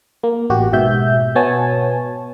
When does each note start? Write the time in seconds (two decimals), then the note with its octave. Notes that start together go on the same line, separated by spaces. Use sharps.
0.23 A#3
0.50 A1 F#4 G4
0.73 G#2 B2 E5 G6
1.35 B2 B3 C#5 G#5 A5